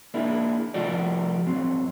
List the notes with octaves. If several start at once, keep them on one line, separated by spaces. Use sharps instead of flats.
A#3 D4 E4 G#4
C2 F3 A3 F4 F#4 D5
G2 F#3 C4